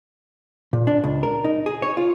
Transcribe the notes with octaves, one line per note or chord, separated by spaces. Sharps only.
A#2
D4
C#2
A#4
D#4
G#4
C#5
F4